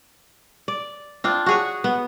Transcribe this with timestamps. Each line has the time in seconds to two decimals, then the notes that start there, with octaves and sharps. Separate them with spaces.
0.68 D5
1.24 C4 D4 F4
1.46 F#4 G#4 C#5
1.84 B3